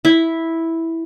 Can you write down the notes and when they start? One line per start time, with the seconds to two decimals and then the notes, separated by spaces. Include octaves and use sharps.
0.05 E4